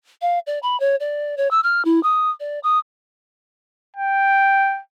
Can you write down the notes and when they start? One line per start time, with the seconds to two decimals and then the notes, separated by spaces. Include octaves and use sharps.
0.22 F5
0.47 D5
0.63 B5
0.80 C#5
1.00 D5
1.37 C#5
1.51 E6
1.64 F6
1.85 E4
2.03 D#6
2.40 D5
2.63 D#6
3.96 G5